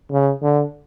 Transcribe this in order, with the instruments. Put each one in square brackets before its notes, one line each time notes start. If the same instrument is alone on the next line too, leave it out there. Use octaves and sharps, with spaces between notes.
[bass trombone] C#3
D3